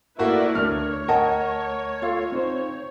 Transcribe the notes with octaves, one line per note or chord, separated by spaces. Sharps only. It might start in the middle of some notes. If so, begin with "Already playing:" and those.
A3 A#3 E4 F#4 B4 D5
D2 A3 D4 A#4 C#5 F6
A#4 D#5 F#5 A5
F4 A4 F5
C4 D#4 C5